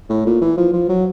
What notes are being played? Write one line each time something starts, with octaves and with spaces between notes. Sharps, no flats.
A2
A#2
E3
F3
F3
F#3